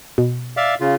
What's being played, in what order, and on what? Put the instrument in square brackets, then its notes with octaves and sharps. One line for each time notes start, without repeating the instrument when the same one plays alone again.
[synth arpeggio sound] B2
[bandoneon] D5 E5 F5
C#3 F4